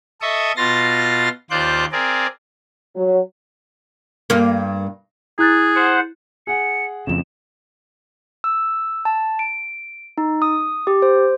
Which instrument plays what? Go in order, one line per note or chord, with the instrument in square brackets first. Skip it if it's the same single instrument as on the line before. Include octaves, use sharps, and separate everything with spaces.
[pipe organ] A4 D#5 E5 C#6 D#6
B2 F4 C6 A6 A#6
D#2 F4 C5 D5 F#6 G6
C4 G#4 A#4 D5
[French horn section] F#3
[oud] G2 A#3
[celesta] E4 F#6 A6 [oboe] G#4
[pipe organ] C5 F#5
[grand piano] G#4 F#5 [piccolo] C#7
[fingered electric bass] F2 C#3 [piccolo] E7
[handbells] E6
A5
D7
D#4
D#6
G4
C5